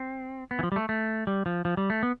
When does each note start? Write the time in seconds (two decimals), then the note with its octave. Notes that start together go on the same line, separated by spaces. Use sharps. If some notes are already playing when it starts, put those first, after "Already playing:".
Already playing: C4
0.51 B3
0.59 E3
0.63 F3
0.72 G3
0.76 A3
0.89 A3
1.27 G3
1.46 F3
1.65 F3
1.77 G3
1.90 A3
2.03 B3